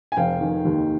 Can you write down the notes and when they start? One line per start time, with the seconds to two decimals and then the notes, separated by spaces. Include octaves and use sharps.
0.12 G#5
0.17 F1 F5 G5
0.41 D#3
0.65 D#2